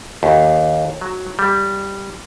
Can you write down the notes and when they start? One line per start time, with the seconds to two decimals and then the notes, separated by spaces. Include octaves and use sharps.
0.23 D#2
1.01 F#3
1.39 G3